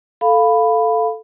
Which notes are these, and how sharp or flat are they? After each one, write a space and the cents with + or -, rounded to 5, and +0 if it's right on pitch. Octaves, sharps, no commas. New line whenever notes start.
A4 +0 F5 +0 B5 +5